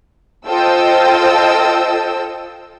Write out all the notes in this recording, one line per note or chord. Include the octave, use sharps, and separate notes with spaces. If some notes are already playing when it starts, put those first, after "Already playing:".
F4 A4 C5 D#5 G5 E6